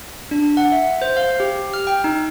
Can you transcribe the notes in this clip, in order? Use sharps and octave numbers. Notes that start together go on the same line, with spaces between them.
D4
F#5
E5
C5
F5
G4
F6
G5
D#4